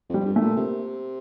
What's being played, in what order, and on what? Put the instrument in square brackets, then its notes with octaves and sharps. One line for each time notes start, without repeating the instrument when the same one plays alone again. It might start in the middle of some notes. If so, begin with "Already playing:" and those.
[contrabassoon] F2
[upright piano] G3
[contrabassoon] F2
G2
[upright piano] A3
[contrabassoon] A#2
[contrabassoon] C3 [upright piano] A#3